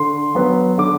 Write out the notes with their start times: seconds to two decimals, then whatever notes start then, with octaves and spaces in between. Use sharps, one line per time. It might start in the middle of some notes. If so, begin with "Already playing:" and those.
Already playing: D3 C6
0.35 F#3 B3
0.78 D3 D6